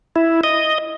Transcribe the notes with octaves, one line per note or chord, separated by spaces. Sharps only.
E4
D#5